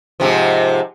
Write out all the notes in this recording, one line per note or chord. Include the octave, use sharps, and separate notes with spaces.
G#2 C3 F3